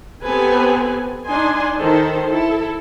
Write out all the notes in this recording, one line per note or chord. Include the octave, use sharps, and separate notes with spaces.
B3 C4 G4 A4 B4 G#5
D4 D#4 G#5 C6
D#3 A4 C5
E4 A4